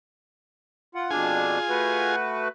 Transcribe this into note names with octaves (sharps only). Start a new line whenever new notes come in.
F4 F#5
F2 B2 D4 F4 G#4 G#5
A3 F#4 B4